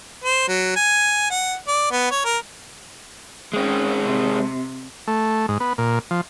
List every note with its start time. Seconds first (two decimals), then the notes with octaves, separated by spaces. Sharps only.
0.24 C5
0.48 F#3
0.76 G#5
1.30 F#5
1.68 D5
1.91 B3
2.11 C#5
2.25 A#4
3.54 G#3 C4 C#4
4.05 C3
5.07 A3
5.48 G#2
5.60 B3
5.78 A#2
6.11 F3